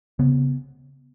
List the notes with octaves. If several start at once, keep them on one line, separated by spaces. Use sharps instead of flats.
C#3 B3